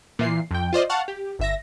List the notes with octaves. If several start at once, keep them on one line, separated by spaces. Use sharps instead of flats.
A#2 E3 C7
F2 G5
F4 C5 D5 D#5
F5 F#5 A5 C#6
G4
G1 E5 A#6